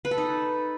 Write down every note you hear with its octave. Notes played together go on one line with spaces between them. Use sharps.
B4
A4
D#4